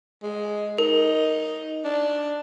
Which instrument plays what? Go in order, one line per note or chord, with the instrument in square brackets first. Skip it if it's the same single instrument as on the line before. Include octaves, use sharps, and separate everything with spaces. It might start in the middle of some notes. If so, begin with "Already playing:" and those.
[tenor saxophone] G#3
[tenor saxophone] D#4 [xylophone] A#4
[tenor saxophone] D4